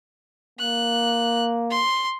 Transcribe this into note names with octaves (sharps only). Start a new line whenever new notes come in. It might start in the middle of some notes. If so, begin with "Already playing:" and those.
A#3 F#6
C6